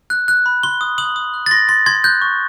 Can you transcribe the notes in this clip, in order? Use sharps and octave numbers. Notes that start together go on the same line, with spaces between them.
F#6
F#6
B5
C6 G7
D#6
D#6 F#7
D#6
F#6
A6
C6 A#6
C6 A6
C6 G#6
F#6 G6
C#6